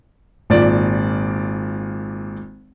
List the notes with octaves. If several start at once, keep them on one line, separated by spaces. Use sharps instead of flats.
G#1 A#2 D5